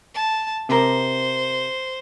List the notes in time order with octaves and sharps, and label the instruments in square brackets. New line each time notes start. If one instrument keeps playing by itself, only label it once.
[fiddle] A5
[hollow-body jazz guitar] C3 A#4 [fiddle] C5